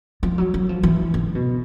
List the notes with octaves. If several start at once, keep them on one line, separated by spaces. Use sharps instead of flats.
F3
F#3
F#3
F3
E3
D3
B2